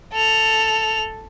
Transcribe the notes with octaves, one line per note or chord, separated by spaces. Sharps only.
A4 F7